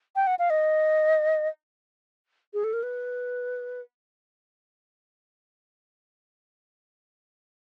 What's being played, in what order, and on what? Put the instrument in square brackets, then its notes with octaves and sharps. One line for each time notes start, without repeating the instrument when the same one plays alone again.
[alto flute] G5
F#5
F5
D#5
G#4
A4
A#4
B4